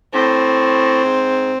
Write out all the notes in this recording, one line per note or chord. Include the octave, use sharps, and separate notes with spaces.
A2 C4
G#2